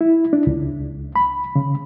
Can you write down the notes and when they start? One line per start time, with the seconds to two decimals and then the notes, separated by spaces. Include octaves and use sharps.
0.01 E4
0.33 D4
0.47 C#2
1.16 B5
1.55 C#3